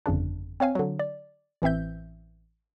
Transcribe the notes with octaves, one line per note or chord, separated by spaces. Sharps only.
G1 F2 C#3 D4
C4 C#5 F5 G#5
D3 F#3
D5
A1 E3 C4 E5 G6